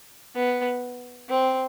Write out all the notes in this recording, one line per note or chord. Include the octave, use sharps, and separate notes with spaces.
B3
C4